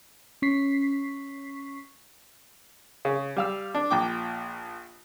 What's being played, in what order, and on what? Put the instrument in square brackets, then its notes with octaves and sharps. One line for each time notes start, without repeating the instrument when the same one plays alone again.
[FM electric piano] C#4 C#6 B6 C7
[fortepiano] C#3
G3 F5 E6
D4
A#1 A#2 G5 D6